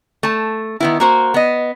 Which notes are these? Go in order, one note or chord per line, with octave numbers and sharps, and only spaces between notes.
A3 A5
D#3 B3 E4
A#3 F#4 C5
B3 D#5